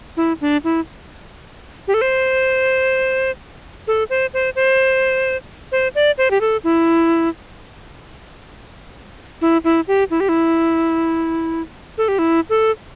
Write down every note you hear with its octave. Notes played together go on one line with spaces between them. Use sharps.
E4
D4
E4
G4
A4
C5
A4
C5
C5
C5
C5
D5
C5
G4
A4
E4
E4
E4
G4
E4
G4
E4
A4
G4
E4
A4